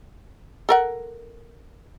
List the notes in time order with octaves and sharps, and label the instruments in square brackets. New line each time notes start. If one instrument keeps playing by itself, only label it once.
[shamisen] A4 A#4 F#5